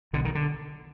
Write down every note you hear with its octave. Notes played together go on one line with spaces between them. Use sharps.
B1 B2 D3
D#3
D3